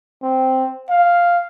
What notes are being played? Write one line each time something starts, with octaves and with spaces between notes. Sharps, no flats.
C4
F5